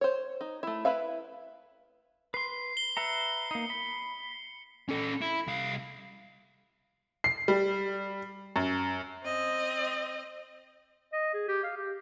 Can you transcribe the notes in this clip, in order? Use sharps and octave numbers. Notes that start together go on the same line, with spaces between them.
C5 C#5
D#4
A3 E4
E4 B4 E5 F5
B4 C6 C7
G7
B4 E5 A#5 C#7
A#3 D#4
B5
C#4 A4
E4
C2 F5
C7
G3
F#2
C4 D#5
D#5
G#4
G4
F5
G4